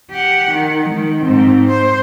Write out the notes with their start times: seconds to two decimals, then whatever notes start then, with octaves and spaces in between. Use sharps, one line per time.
0.11 G4 F#5
0.52 D#3
0.88 D#3 G#3
1.22 G#2 C4
1.67 C5